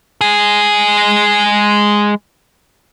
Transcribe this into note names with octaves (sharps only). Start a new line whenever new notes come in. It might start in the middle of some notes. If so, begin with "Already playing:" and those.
G#3 G#4